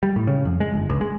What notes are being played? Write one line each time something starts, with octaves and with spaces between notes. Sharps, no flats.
G3
A2
C#3
F2
G#3
G1
C#2
G#3